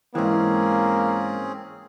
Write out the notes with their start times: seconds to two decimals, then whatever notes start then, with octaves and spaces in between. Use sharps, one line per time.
0.15 G#2 E3 A#3 C4 C#4 G#4